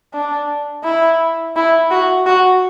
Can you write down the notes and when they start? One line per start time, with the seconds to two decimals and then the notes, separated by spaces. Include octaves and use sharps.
0.14 D4
0.84 E4
1.56 E4
1.91 F#4
2.26 F#4